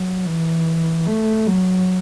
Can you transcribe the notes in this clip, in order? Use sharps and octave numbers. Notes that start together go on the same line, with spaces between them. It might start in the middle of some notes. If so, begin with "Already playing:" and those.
Already playing: F#3
E3
A3
F#3